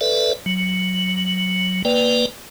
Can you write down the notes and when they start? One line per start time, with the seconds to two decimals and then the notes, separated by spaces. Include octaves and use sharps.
0.01 A4 B4 D5 E5
0.46 F#3
1.85 A#3 B4 D5 G5